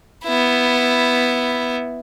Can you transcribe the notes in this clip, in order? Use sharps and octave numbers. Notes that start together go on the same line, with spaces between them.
B3 E4